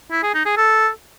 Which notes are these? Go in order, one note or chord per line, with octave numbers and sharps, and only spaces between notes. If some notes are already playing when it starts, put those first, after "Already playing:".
E4
G#4
D#4
G#4
A4